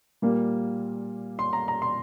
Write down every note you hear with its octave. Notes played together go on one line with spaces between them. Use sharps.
A#2 G3 A#3
C6
A#5
A#5
C6